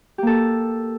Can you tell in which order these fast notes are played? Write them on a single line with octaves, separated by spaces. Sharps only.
G4 A#3 A4